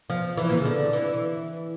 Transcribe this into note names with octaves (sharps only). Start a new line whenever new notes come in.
F3
E3
A#2
C#3
D3
E3